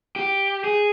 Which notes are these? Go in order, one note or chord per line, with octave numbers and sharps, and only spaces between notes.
G4
G#4